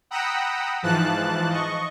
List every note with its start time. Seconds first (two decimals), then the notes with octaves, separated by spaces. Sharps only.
0.11 F#5 G5 A#5 B5 D#6 E6
0.82 G#2 E3 F3 A5 F#6
1.49 D#5 C#6